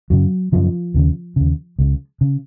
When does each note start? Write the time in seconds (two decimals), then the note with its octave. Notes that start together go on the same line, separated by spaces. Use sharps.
0.10 F#2 C#3 F#3
0.52 F#2 C#3 F3
0.94 D#2 C#3
1.36 D#2 C#3
1.79 C#2 C#3
2.21 C#3